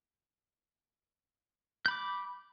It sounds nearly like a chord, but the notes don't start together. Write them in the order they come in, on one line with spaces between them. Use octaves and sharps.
G6 B5 D6